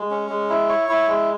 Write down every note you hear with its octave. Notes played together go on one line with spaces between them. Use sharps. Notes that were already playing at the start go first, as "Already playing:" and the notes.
Already playing: G#3
C#4
G#3
E4
C#5
E4
G#3